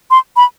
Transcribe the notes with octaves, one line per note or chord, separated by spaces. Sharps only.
C6
B5